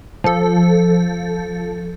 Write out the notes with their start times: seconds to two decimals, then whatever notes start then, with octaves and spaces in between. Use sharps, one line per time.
0.24 F3 A4